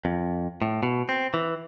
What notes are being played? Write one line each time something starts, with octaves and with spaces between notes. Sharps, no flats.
F2
A2
B2
C4
E3